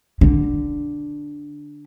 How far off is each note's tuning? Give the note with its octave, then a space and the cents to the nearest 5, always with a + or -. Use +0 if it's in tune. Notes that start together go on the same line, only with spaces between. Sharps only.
D3 +0